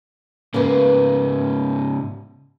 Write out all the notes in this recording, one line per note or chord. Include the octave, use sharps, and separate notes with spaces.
G#2 C#3 A#3 B4